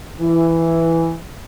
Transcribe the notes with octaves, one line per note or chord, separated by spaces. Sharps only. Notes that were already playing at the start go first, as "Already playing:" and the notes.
E3